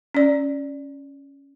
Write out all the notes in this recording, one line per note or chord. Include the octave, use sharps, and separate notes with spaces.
C#4 D5